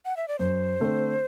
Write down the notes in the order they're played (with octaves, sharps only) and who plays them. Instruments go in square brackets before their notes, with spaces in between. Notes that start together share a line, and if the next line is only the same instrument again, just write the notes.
[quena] F#5
E5
D5
[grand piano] F#2 [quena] C5
[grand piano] D3 A3 C4